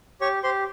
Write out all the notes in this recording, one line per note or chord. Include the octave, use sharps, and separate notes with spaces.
G4 C#5 C#6
G4 C5 C6